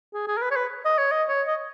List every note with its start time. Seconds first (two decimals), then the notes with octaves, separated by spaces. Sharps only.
0.14 G#4
0.27 G#4
0.37 A#4
0.42 B4
0.51 C#5
0.56 B4
0.85 D#5
0.98 C#5
1.12 D#5
1.28 C#5
1.47 D#5